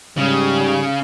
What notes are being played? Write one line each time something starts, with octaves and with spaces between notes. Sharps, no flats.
G#2 C#3 G3